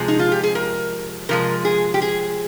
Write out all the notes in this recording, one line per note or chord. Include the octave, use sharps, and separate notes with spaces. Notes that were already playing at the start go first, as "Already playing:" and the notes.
Already playing: C3 F3 G#3 G#4
D#4
F4
G4
G#4
A#4
C3 F3 G#3 A#4
G#4
G4
G#4